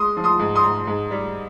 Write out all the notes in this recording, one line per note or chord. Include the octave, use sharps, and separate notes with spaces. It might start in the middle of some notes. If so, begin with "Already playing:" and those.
Already playing: G#3 C6 D#6
F3
C6 D#6
G#2
C6 D#6
G#2
G#2
G3